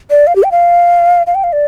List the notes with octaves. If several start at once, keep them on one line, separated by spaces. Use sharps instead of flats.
D5
F5
G4
G5
F5
F5
G5
F5
D5